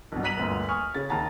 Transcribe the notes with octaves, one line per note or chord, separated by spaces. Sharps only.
B1 G2 B2
A#5 F#6 B6 D#7 F7 F#7
G1 D2 A#2
G#5 C#6 D#6 F6
C#3 C#4 A6
D#2 A5 A#5 A6